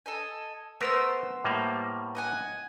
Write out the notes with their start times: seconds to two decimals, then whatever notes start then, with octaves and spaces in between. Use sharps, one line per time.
0.06 A4 D#5 G#5
0.81 A3 B3 A#4 C5 E6
1.44 A2 G3 A#3
2.15 D#5 F#5 G#5